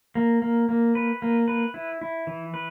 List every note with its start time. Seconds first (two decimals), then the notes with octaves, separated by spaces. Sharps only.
0.15 A#3
0.42 A#3
0.69 A#3
0.95 B4
1.22 A#3
1.48 B4
1.74 E4
2.01 E4
2.27 E3
2.54 B4